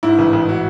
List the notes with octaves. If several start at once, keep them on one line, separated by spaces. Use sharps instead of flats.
G#2 E4
A1
A1
F#4